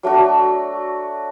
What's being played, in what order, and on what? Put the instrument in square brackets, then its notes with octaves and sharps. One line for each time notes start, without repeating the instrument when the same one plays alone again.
[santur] F#3 A3 D4 F#4